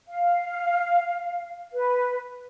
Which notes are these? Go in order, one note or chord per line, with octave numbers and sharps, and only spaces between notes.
F5
B4